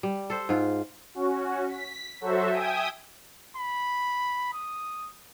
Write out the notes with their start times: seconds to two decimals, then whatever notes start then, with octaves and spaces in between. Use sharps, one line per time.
0.03 G3
0.30 A4 C5
0.49 G#2 F4
1.14 C#4 F#4
1.68 B6
2.21 F#3 F#4 A4 C5 E5
2.52 E5 G5 G#5 D#6
3.57 B5
4.53 D#6